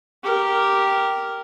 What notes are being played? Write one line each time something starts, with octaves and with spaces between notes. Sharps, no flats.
G4 A#4